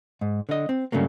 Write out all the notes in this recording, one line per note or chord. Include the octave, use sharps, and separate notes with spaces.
G#2
D3 D#5
C4
G2 C#3 F#3 A3 A#3